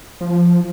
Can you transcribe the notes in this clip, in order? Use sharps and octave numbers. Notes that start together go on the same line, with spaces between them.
F3